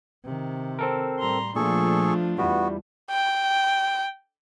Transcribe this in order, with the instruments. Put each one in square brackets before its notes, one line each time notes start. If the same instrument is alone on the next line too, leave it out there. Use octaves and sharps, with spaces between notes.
[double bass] C3 D#3
[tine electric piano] C4 A4 A#4
[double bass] A2 G3 [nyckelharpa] A#5 C6
[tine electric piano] A#2 [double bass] F3 A3 [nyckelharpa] D4 F4 [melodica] G#4 A4 C#6
[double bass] E2 [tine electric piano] G3 E4 [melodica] B3 F#4
[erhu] G5